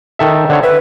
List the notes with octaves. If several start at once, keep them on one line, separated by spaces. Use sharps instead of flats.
D#3 A4 E5
D3 C5 C#5
B4 E5